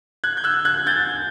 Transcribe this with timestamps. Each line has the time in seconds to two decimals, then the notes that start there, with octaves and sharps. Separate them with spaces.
0.24 F#6 G#6
0.37 G6
0.44 E6 F#6
0.65 F#6 G#6
0.87 G6 A6